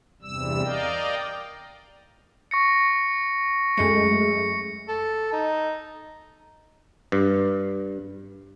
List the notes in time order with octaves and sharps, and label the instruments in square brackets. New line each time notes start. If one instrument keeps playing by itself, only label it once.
[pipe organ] E2 G2 C3 G3 E6
A#4 D5 D#5 F5 G5
[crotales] C#6 A#6 C#7
[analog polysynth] F#2 G#3 A3 [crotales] C#7
[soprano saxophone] A4
D#4
[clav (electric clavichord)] G2